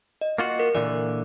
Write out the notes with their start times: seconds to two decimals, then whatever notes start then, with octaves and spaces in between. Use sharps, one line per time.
0.21 D#5
0.38 A#3 F4 F#4
0.59 A#4
0.75 A#2 D3 E3 D5